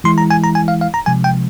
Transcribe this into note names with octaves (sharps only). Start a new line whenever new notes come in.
E3 G#3 E4 C6
A#5
G#5
A#5
G#5
F5
F5
A#5
C3 F3 G#3 G#5
G5